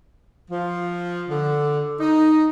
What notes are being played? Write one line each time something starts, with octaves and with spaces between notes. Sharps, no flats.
F3
D3
D#4